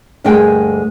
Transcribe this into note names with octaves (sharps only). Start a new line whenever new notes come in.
D2 G2 G#3 A#3 G5 G#5